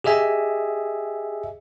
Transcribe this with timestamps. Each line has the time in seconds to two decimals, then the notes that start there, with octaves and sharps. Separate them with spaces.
0.04 G4 G#4 D#5 E5 G#5